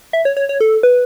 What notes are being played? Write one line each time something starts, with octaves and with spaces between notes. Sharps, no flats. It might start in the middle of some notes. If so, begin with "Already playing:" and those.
E5
C#5
C#5
C#5
A4
B4